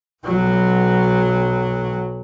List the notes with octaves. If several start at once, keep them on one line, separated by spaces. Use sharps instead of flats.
B1 F#3